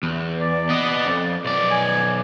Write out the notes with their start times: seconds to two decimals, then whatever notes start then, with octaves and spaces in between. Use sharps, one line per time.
0.03 E2
0.41 D5
0.70 B3 D#5
1.06 F2
1.45 B1 D5
1.71 G#5